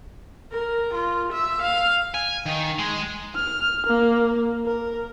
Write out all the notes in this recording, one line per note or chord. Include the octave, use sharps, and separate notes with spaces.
A#4
F4
E5
F5
G#5
D#3
G#3
F6
A#3
A#4